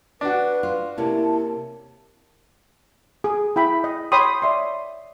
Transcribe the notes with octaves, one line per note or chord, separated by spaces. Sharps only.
D4 F#4 B4
F4
C3 A#3 C#4 E4 A5
G#4
E4 G5 B5
D#5
C#5 G5 B5 C6 D#6
D5 E5 C6